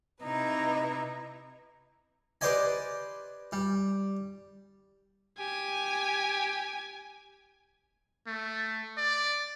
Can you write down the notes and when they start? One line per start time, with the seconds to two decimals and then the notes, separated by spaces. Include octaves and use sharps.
0.23 C3 D#4 E4 B4 A#5
2.41 G4 B4 C5 D5 D#5 G#5
3.52 G3
5.39 G4 G#5
8.27 A3
8.97 D5